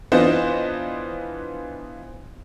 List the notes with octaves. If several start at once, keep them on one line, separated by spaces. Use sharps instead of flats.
E3 B3 D4 F4 C5 D#5